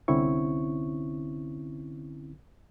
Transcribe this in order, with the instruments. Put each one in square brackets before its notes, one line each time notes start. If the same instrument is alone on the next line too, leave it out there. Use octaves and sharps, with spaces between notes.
[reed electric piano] C2 D3 C4 C#4 E4 C#6